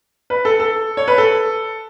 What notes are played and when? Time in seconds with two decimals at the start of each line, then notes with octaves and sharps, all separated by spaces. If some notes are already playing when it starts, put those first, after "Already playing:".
0.30 B4
0.45 A4
0.60 A4
0.97 C#5
1.08 B4
1.18 A4